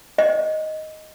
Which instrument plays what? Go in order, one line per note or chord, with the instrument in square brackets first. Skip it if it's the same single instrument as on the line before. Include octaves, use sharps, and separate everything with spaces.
[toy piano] D#5